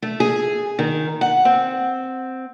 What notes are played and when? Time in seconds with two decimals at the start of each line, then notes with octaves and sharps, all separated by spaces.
0.02 A3
0.20 G#4
0.79 D#3
1.21 F#5
1.45 C4